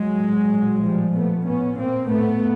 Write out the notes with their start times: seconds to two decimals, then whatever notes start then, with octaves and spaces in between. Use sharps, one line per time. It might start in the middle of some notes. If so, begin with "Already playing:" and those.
Already playing: F#3 G#3
0.20 A2
0.52 A#2
0.83 A2 F3 G3
1.15 A#2 A3 B3
1.46 A2 B3 C#4
1.78 A#2 A#3 C4
2.09 A2 A3 B3